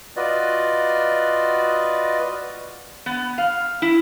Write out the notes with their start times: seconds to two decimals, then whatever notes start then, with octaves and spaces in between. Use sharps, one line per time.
0.17 F4 F#4 B4 D5 D#5
3.06 B3
3.38 F5
3.82 E4